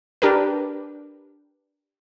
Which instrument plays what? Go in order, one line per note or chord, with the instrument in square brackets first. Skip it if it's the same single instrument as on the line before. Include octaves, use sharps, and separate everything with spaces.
[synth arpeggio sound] D4 G4 A#4 B4